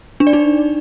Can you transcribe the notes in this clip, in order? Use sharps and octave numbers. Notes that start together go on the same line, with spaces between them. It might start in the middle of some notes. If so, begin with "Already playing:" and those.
D4
D5
D#4